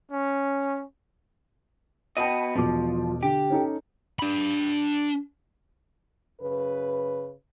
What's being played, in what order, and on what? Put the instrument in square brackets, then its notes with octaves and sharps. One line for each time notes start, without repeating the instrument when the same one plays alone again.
[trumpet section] C#4
[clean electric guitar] B3 F#4 D#5 [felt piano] G5 A5 D#6
[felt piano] E1 B2 D6 [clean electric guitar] F3
[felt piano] D3 [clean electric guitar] G4
[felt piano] C#4 D#4 A4
[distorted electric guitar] D4 B5
[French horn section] F#2 C#3 B4